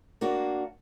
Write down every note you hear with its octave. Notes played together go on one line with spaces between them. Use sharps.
A#3 D4 F#4